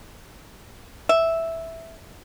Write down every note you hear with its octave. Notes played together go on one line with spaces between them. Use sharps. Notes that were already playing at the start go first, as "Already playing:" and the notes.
E5